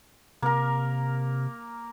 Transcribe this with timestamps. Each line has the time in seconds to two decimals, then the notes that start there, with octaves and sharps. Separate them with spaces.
0.42 C3 A#3 A#4